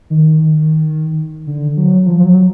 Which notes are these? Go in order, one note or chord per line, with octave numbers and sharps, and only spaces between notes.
D#3
D3
F#3
F3
F3
F#3